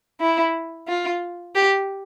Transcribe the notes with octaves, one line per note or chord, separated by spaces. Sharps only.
E4
F4
G4